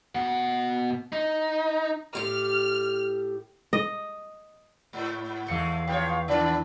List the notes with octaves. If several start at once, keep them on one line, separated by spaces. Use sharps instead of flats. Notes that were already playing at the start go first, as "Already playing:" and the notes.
B2 F#5
D#4
A2 G4 F6
D#5
G#2
E2 G#3 A3 F5 C#7
F3 C4 B4 C#5 G5
D#3 D4 D5